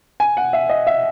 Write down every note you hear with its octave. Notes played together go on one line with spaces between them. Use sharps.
G#5
F#5
E5
D#5
E5